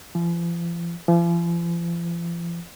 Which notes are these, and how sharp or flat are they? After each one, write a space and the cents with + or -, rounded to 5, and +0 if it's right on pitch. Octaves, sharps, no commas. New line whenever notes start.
F3 -45
F3 -45